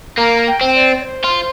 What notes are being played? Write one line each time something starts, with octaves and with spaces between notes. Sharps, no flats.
A#3 A#5
G5
C4
D5
D5
C5
F4